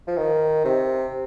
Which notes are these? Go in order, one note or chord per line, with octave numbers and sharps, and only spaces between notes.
F3
D#3
C3